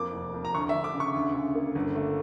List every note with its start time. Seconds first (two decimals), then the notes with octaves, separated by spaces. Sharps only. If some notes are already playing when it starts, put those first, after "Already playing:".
Already playing: F2 A#3 D6
0.13 F1
0.34 F2
0.45 A#5
0.54 D2 C#6
0.69 E5
0.74 D2
0.84 D6
0.94 C#3
1.00 C#6
1.14 D2
1.35 C#3
1.55 A#3
1.75 G1
1.95 A3